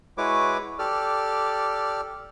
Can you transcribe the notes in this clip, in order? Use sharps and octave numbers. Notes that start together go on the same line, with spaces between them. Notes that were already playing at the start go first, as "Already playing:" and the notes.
G#3 E4 F#4 B4 C#5 D6
G4 A4 D5 F6